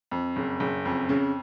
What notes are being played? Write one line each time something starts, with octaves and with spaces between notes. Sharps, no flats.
F2
F#1
F#1
F2
C#3